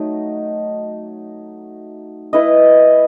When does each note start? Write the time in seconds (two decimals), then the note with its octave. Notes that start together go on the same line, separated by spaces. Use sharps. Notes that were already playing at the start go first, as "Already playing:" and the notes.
Already playing: F#3 A3 D#4
2.33 E4 B4 D#5